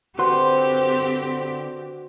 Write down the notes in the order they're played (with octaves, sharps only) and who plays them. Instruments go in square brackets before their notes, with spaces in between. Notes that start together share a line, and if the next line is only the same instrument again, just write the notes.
[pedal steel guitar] D3 B4 C6 [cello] C4 G4 [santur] F#4 C5 F#5